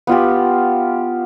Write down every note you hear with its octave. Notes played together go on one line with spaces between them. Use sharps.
B3 F4 G4